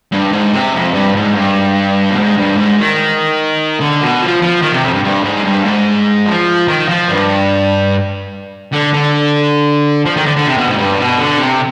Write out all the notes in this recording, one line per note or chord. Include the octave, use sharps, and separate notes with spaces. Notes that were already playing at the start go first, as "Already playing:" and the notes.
G2
G#2
C3
F2
G2
G#2
G2
B2
G#2
G2
G#2
D#3
D3
B2
F3
F3
D#3
C3
F2
G2
G2
G#2
G2
G#2
F3
D#3
F3
G2
D3
D3
F3
D#3
D3
D3
C3
B2
G#2
G2
B2
D3
C3